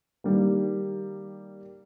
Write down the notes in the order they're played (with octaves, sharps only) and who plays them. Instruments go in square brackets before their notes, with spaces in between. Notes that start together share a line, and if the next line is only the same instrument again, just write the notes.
[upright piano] D#3 G3 A#3